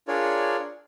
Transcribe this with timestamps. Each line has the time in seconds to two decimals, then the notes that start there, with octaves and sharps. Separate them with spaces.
0.08 D4 F4 G#4 A#4 C#5 D5